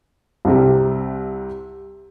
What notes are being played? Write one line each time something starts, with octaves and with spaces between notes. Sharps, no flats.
C2 C3 G3